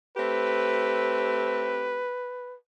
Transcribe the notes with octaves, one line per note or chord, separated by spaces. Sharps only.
A3 C4 G4 B4